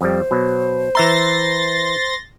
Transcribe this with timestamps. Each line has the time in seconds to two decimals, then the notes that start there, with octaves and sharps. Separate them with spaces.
0.01 F2 G3 C5
0.31 B2 F#3
0.95 E3 E5 A#5 C6 A6 A#6